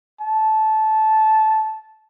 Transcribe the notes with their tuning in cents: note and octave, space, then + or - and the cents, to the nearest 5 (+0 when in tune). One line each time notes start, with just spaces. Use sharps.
A5 -15